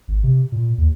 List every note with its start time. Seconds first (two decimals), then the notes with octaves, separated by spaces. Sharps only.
0.08 G#1
0.23 C3
0.52 A#2
0.78 D#2